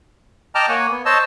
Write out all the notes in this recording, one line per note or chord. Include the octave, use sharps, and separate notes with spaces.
D#5 G5 A5 A#5 D6 F6
A#3 C#5 F#5 G#5
B3
C5 C#5 D#5 A5 E6